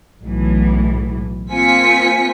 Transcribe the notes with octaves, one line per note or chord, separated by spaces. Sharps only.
B1 A2 E3
A#3 C4 F4 G#5 B6 C#7